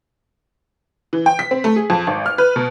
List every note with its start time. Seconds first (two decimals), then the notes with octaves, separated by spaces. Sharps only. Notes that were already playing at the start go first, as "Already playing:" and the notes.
1.13 E3
1.26 G5
1.39 B6
1.51 C4
1.64 A3
1.76 G#4
1.90 F2
2.07 G#1
2.26 F6
2.38 B4
2.56 B2